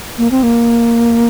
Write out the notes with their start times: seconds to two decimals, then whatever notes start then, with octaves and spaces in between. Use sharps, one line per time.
0.18 A#3
0.31 C4
0.43 A#3